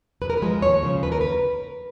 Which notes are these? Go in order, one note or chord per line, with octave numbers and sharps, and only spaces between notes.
F#2 B4
A#4
B4
F3 G#3
D#2 C#5
C#3 F3
D#2 B4
A#4
B4